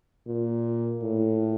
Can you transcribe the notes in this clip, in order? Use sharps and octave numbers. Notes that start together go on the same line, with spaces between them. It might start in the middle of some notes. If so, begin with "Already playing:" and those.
A#2
A2